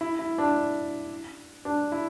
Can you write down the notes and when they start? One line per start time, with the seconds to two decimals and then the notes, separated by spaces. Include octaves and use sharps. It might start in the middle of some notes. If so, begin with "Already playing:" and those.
0.01 E4
0.19 E4
0.38 D4
1.65 D4
1.92 E4